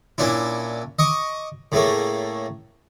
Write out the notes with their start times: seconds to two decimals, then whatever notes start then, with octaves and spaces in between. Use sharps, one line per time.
0.18 A#2 C#4 D4 E4
0.99 D#5 C#6 D6
1.72 A2 C#3 A3 A#3